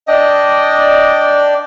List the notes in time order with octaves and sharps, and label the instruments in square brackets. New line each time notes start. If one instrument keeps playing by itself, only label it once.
[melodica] D4 D5 G5 [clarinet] D#5